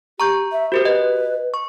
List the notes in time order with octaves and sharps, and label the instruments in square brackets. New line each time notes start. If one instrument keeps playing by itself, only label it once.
[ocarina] G4 [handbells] A#5 C#6 G6
[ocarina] E5
[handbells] F#4 G4 A#4 [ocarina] C5
[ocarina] B4 [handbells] D#5
[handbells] C#6